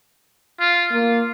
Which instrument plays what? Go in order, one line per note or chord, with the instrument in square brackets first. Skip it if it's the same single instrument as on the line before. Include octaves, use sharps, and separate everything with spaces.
[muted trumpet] F4
[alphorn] A#3 [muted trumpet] F4